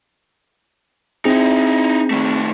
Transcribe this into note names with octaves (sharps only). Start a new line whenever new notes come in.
C4 D#4 E4 G#4
D#3 A3